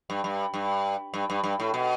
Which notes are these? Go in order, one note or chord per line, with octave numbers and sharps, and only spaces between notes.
G2
G2
G2
G2
G2
G2
A2
B2